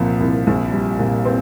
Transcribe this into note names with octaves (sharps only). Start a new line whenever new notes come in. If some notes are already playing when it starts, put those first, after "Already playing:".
Already playing: C2 A#2 F3
C2
A#1
G3
A#2
C4